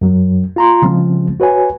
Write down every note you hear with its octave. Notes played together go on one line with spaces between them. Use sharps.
F#2 F#3
F4 A#5 C6
C#3 F3 G#3 C4
F#4 B4 C#5 G#5